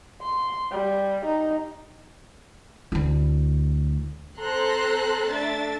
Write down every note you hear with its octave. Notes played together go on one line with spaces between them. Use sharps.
C6
G3
D#4
D2 E4
C4 A4 C5 A#5 C6 F#6
A3 D4 E5 A6